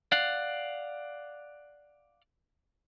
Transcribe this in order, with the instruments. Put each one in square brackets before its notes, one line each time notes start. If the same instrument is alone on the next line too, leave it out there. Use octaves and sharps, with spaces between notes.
[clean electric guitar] D5 F5 F#5